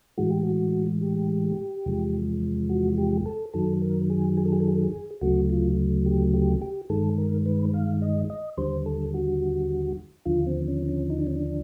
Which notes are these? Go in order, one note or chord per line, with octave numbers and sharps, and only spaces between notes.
A2 E3 G#3 F#4
G4
F#4
G4
E2 C3 F3 G#3
F#4
G4
A4
F#2 D#3 F#3 A4
A#4
G#4
G#4
A4
G#4
A4
G#4
A4
G#4
D2 C#3 F#3 A3 F#4
F4
G4
G4
G4
G2 D#3 G#3 A4
A#4
B4
F5
D#5
D#5
D#2 D3 G3 C5
A4
F#4
D#2 D3 F3 F4
C4
C#4
C#4
D#4
D4
C#4
D4